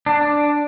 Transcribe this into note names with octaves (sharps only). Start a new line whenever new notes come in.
D4